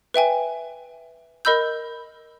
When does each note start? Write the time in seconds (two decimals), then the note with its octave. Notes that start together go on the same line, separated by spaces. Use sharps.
0.14 B4 E5 G5 G#5
1.45 A#4 D#5 B5 E6 G6